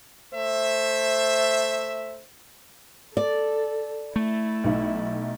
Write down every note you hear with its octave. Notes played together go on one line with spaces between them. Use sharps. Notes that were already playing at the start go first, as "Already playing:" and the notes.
A3 C5 E5
A4 D5
A3 E4
B1 D#4 E5